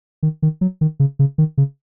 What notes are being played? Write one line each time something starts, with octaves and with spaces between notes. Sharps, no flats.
D#3
D#3
F#3
D#3
C#3
C#3
D#3
C#3